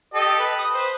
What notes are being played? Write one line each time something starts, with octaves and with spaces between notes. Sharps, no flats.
G4 A4 D#5
B4
D#6
B4 C5